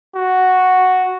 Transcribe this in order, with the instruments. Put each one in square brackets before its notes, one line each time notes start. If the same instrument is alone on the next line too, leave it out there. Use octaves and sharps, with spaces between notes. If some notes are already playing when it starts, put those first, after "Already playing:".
[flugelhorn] F#4